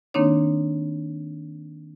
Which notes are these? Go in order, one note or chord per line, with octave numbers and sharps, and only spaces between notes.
D#3 A#3 C4 D4 D#4 C#5